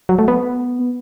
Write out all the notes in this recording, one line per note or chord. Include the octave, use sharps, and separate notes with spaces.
F#3
A3
B3